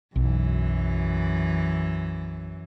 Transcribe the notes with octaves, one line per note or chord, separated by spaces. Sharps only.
B1 F#2 E3